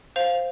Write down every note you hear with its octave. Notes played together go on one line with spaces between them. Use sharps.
C5 F5 F7